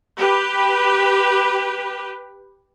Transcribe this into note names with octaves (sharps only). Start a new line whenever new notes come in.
G4 B4